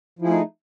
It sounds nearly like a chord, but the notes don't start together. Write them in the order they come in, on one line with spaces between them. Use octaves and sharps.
F3 E4 G#4 A3 D#4